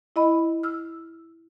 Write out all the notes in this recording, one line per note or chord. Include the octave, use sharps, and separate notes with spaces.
E4 D#5 B5
E6 F6